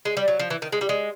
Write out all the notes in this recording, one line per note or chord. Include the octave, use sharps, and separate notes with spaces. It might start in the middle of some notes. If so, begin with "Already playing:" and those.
G#3
G3
F#3
F3
E3
D#3
G#3
G3
G#3